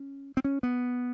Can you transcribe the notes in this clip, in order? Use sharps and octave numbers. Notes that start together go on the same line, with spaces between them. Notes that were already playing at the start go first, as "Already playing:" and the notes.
Already playing: C#4
C4
C#4
B3